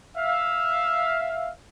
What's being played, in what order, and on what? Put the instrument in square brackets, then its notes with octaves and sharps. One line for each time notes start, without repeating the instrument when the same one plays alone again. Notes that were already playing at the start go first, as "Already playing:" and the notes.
[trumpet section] E5 F5